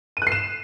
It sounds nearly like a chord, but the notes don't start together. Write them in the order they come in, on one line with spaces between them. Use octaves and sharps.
D#7 F#6 C7 E7